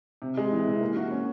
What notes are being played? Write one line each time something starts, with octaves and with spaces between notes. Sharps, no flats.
C3
G#3
E3
C3
A#3
F#4
C#4